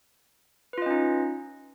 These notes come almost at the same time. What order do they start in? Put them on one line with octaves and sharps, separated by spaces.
B4 F4 D#5 C#4 D#4